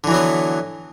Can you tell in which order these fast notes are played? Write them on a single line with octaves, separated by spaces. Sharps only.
D3 E3 F#3 B3